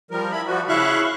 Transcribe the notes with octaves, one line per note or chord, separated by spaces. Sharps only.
F3 G3 A#4
E4 B5
F3 G3 F#4
C#3 E4 E5 F5 C#6 F#6